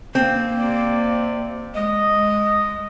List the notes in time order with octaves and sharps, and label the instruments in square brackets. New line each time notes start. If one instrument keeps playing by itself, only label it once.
[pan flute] A#3 [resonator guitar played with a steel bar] C4
[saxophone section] C3 D5
[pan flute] G#3 [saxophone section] D#5